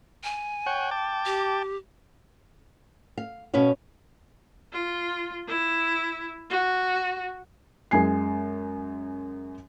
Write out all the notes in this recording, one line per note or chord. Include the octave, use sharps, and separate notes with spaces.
G#5
C#5 F#5 G5
G5 A5 D6
G4
F5
B2 C#4 B4 C#5 F5
F4
E4
F#4
F#2 G#3 G#5 C7